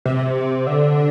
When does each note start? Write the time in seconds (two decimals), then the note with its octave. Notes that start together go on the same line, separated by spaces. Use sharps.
0.06 C3
0.67 D3